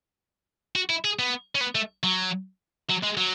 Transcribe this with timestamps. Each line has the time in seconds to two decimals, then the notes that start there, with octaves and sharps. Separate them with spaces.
0.76 F#4
0.90 E4
1.05 G#4
1.19 B3
1.55 C#4
1.61 B3
1.75 A3
2.04 F#3
2.89 F#3
3.03 G#3
3.17 F#3